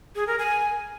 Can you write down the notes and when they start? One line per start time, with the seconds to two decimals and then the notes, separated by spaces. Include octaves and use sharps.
0.15 G#4
0.27 A#4
0.39 G#5